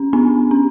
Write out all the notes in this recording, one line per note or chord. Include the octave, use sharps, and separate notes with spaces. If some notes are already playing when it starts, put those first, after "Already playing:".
Already playing: C#4
B3 D4
C#4